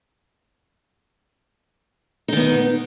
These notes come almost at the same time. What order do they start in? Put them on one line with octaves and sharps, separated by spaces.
D#4 D#3 B3